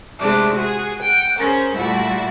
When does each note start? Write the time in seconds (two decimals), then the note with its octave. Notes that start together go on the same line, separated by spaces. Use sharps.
0.17 C3 G#3 A3 D4
0.55 F#4 G#4
1.01 F#5 G5
1.39 C#4 G#4 A#4 C5
1.75 A#2 G3 A3 E4 F#4